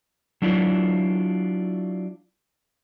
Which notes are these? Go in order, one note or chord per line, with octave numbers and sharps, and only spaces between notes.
F#3 D4 E4 F4